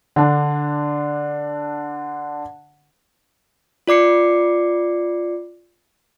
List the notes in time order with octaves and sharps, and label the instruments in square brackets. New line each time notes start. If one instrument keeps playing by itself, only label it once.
[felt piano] D3 D4
[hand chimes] F4 D5 D6 C7 C#7